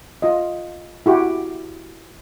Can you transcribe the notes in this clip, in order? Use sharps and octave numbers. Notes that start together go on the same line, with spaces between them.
F4 D#5
E4 F#4 G4